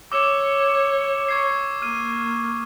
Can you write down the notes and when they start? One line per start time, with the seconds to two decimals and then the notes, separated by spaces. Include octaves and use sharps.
0.12 C#5 D6 E6 E7
1.29 C#6 G#6 C7
1.82 A#3 F6 D#7